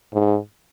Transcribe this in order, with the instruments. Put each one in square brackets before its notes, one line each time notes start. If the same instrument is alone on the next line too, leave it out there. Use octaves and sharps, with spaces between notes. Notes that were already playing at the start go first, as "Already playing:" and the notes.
[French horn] G#2